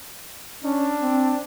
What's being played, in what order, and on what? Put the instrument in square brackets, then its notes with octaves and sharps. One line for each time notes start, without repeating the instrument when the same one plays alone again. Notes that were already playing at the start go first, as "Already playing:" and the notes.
[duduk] C#4 [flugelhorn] D4
[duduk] C4